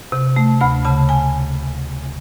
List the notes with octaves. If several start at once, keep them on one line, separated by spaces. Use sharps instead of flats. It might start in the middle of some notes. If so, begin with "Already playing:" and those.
C3
A3
D2 B5
C#3 A5
G#5